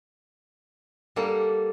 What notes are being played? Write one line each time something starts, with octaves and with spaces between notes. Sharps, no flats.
G3 A#3 A4 F#5